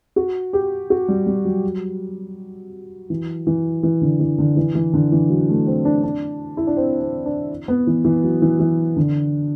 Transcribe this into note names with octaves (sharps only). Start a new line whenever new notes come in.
F#4
G4
F#4
G3
G3
F#3
E3
E3
E3
D3
E3
D3
E3
E3
D3
E3
F#3
A3
C4
D4
D4
E4
D4
C4
C4
D4
B3
E3
E3
F#3
E3
E3
D3